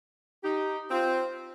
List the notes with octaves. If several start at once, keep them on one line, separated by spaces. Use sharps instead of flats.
D#4 G4
C4 F4